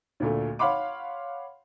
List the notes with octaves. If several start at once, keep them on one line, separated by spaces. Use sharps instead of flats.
D2 A#2 A3
C#5 F5 F#5 B5 C6 D6